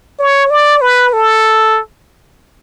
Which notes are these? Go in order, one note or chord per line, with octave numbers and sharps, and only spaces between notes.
C#5
D5
B4
A4